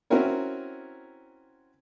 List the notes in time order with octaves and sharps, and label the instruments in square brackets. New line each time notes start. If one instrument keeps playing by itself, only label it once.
[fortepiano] C4 C#4 E4 F#4 A#4 C#5